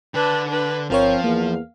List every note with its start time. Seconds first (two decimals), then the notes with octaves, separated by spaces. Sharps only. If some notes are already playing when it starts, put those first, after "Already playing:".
0.14 D3 D4 B4
0.48 D4 B4
0.90 G1 F3 C4 A#4 C#5 F5
1.24 E2 A#3